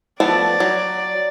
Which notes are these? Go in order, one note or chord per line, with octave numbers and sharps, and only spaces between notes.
F3 A3 B3 D5
F#3